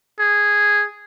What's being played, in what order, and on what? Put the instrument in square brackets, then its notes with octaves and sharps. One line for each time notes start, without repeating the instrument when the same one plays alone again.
[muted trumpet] G#4